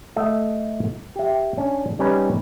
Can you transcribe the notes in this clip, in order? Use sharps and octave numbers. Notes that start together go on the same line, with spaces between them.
A3 D#5 E5
G4 E5
C#4 D4
G3 C#4 D#4 B4